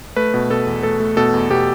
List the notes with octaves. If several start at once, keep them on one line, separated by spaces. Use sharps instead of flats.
A3 B4
B2
B2 A4
E2
A3 A4
A3
B2 A4
E2
B2 G4